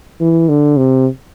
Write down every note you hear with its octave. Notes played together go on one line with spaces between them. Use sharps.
E3
D3
C3